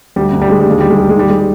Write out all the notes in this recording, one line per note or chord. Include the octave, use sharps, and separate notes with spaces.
D2 G3
D2
G3
D2 G#3
D#2 G3
G#3
D#2 G3
G#3
D#2 G3
G#3
D#3 G3
G#3
G3